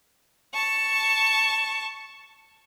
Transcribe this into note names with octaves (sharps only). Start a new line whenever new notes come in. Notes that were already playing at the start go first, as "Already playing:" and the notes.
A5 C#6